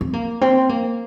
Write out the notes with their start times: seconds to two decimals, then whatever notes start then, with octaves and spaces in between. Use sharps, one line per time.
0.01 C4
0.13 A#3
0.41 C4
0.69 A#3